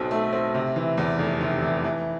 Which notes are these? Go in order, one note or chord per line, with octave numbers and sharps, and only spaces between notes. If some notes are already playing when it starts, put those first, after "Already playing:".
Already playing: B1 B2 C4
A3
C4
C3
E3
E2
F1
C3
E3
E3